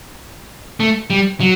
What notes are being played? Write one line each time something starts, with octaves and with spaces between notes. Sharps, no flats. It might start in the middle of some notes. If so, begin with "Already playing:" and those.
A3
G3
F#3